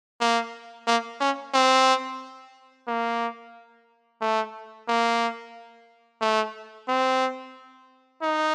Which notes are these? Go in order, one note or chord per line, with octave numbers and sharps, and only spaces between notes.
A#3
A#3
C#4
C4
A#3
A3
A#3
A3
C4
D#4